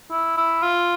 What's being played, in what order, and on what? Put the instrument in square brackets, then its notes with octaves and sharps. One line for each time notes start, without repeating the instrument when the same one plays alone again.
[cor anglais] E4
E4
F4